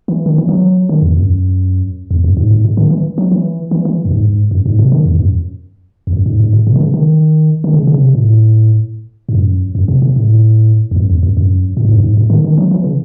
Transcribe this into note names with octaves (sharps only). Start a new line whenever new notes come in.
E3
D#3
E3
F#3
D#3
E2
F#2
E2
F#2
G#2
G#2
A2
D#3
E3
F#3
E3
E3
E3
F#2
G#2
F#2
G#2
C3
D#3
E2
F#2
E2
F#2
G#2
G#2
A2
C3
D#3
C#3
D#3
D#3
C#3
C#3
C3
A2
G#2
F#2
F#2
C3
C3
A2
E2
F#2
E2
F#2
F#2
A2
G#2
F#2
G#2
A2
D#3
D#3
F#3
E3
C#3